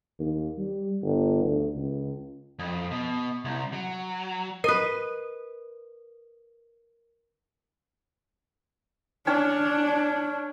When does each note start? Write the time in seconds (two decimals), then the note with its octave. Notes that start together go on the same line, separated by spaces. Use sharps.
0.19 D#2
0.58 G3
1.02 G1
1.43 D2
1.76 C#2
2.59 F2
2.91 B2
3.45 C2
3.73 F#3
4.64 A#4 B4 D#5
9.27 C#4 D4 C#5 A5